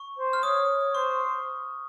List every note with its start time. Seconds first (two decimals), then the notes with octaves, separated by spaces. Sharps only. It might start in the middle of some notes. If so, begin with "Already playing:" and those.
Already playing: C#6
0.17 C5
0.33 F6
0.43 C#5 D#6
0.94 C5 C#6